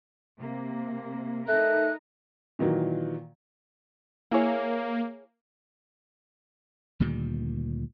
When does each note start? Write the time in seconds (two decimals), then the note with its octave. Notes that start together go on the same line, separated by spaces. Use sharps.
0.40 C3 A#3
1.48 A3 D#4 A#4 F#6
2.59 A#2 D#3 E3 F#3
4.31 A#3 E4 G#4 C#5
7.00 D2 A#2 D#3 G3